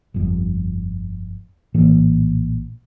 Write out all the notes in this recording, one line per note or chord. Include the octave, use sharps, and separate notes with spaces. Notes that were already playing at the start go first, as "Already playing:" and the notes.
G1 F2
A#1 A2 E3 A#3